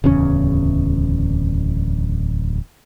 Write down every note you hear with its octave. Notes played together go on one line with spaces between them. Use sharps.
D1 E2 C#3 C#4